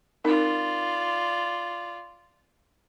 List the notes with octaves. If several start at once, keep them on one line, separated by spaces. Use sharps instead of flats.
C4 D#4 F4 A#4 D5